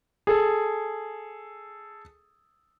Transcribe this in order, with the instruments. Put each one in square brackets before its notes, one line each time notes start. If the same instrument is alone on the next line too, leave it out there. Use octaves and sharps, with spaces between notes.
[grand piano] G#4 A4